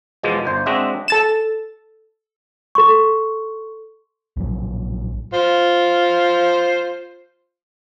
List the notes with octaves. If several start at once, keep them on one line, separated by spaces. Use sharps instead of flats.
E2 B2 F3 G#3
G1 C5
G#3 C4 D4 F#4 D#5 E5
A4 A6 E7
A4 C6 C#6
A#1 A2 F#3
F4 C5